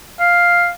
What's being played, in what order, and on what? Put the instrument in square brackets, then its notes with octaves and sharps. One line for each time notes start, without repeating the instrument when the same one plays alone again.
[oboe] F5